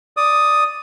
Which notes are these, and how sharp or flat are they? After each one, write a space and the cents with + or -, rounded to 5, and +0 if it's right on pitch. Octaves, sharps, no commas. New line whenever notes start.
D5 +0 D#6 +0